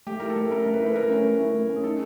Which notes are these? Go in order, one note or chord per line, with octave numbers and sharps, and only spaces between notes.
A3 G4
E4 A#4
A4
A3
C#4 A#4
A3
B4
E4
B4
A3 A#4
C#4
A3
E4
A3
C#4
G#4
D#4 A4